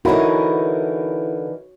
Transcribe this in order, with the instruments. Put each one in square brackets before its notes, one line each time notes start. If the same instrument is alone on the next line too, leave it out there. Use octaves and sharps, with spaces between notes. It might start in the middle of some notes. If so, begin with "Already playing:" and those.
[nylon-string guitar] D3 B3 [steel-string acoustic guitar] E3 D#4 A#4 [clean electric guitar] E4 [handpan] F#4 C#5